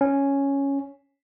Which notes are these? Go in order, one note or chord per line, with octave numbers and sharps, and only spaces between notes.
C#4